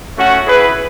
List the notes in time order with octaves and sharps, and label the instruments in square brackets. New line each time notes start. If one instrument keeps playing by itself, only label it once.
[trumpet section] A3 C#4 F#4
E4 G#4 B4